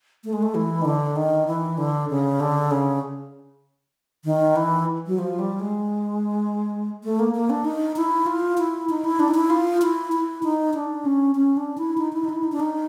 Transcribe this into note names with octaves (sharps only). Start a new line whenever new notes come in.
A3
G#3
A3
E3
D#3
D3
D#3
E3
D3
C#3
D3
C#3
D#3
E3
F#3
F3
G3
G#3
A3
A#3
A#3
D4
D#4
E4
F4
E4
D#4
E4
D4
D#4
E4
F4
E4
E4
D#4
D4
C#4
C#4
D4
E4
D#4
E4
D#4
E4
D#4
D4
D#4